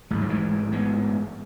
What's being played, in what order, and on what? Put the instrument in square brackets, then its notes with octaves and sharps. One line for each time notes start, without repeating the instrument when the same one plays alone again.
[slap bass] A1 G#2 G#3
F#3
E3 G#3
G#3 B3